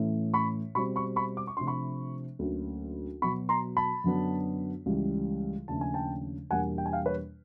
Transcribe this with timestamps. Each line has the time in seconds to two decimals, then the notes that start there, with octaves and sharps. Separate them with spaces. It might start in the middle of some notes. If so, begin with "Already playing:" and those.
Already playing: A2 E3 A3 C#4
0.34 B5 C#6
0.75 B2 G3 C4 B5 C#6
0.96 B5 C#6
1.16 B5 C#6
1.37 D6
1.47 C#6
1.57 C3 F3 A3 D4 C6
1.67 B5 C#6
2.39 D2 D3 F#3 A#3 C#4
3.22 B2 F#3 B3 B5 C#6
3.49 A#5 C6
3.77 A5 B5
4.04 F#2 D3 F#3 B3 D4
4.86 C#2 C#3 E3 G3
5.68 D#2 C#3 F3 A3 D4 A5
5.81 G#5
5.94 G5 A5
6.51 E2 B2 G3 A#3 D4 F#5 G#5
6.78 G5
6.86 G#5
6.92 F5 G5
7.06 B4 C#5